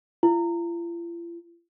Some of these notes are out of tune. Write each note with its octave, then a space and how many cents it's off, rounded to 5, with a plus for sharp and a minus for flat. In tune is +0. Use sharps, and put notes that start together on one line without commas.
F4 -45